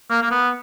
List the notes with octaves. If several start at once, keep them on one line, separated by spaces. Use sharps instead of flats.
A#3
A#3
B3